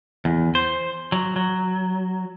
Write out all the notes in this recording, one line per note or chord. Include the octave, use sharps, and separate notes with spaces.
E2
C5
F#3
F#3